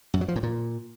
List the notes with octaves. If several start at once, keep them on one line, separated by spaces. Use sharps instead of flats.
F#2
F#3
F3
A2
A#2